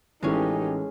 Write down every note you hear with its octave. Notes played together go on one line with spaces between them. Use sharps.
A1 E3 G#3 C#4 D#4 G4 A4